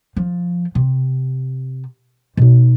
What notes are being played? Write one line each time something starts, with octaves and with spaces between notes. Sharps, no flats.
F3
C3
B2 D#4